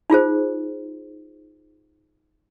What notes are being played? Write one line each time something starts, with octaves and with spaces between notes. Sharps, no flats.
D#4 F4 G#4 C5